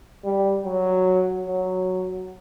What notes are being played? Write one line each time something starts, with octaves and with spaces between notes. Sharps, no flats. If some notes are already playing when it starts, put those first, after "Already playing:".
G3
F#3
F#3